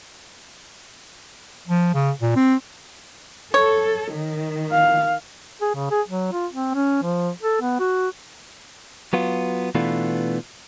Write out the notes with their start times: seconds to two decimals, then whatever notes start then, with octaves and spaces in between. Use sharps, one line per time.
1.67 F3
1.94 C#3
2.21 A#2
2.36 C4
3.54 A4 C#5
4.15 D#3
4.72 F5
5.61 G#4
5.75 C#3
5.91 G#4
6.08 F#3
6.32 F4
6.53 C4
6.75 C#4
7.03 F3
7.43 A4
7.61 B3
7.80 F#4
9.13 F#3 B3 F4
9.75 B2 E3 A3 B3 D4 F4